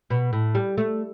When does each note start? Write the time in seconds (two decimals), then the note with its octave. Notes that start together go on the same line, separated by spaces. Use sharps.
0.10 B2
0.33 A2
0.55 G3
0.77 A3